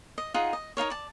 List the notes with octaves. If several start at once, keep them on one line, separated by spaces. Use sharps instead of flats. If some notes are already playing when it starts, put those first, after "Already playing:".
D#5
D#4 F4 G#4 F#5
D#5
D#4 F4 A#4 C#5
D5 A5